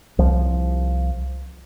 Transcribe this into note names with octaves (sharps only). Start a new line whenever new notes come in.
C2 F3